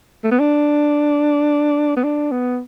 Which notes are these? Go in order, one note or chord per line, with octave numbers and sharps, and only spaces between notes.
A3
B3
D4
B3
D4
B3